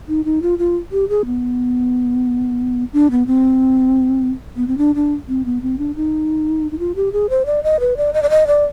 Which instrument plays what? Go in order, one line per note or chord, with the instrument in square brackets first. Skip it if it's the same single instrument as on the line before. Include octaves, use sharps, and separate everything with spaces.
[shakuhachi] D#4
D#4
F4
F4
G4
G#4
B3
D4
B3
C4
B3
C4
D4
D4
C4
B3
C4
D4
D#4
D#4
F4
G4
G#4
C5
D5
D#5
B4
D5
D#5
D5
D#5
D5